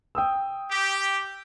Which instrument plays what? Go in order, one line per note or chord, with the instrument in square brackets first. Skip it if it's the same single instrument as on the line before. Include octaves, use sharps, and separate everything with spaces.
[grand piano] G5 D#6 E6
[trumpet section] G4